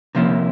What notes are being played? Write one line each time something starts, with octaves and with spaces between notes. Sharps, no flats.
C3 F3 A#3 C#4 E4